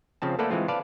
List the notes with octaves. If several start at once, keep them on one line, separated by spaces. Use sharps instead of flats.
C#3 F3 C4 A5
A3 A#3 A4 B4 D5 F#5
E3 G#3 C4 F4
B4 D5 F5 A5